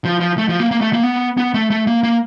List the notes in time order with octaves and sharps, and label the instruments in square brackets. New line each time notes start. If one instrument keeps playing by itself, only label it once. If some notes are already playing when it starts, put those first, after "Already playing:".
[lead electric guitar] F3
F3
A3
F3
A#3
A#3
A3
A#3
B3
B3
A3
A3
A#3
A#3